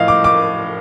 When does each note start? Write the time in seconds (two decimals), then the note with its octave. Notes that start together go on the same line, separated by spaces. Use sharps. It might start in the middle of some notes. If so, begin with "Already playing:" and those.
Already playing: A2 F3 D#5 F5
0.08 D6
0.24 D6